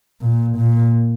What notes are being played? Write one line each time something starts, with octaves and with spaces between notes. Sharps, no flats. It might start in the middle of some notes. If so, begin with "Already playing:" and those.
A#2
A#2